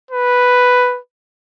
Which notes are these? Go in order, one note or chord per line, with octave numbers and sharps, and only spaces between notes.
B4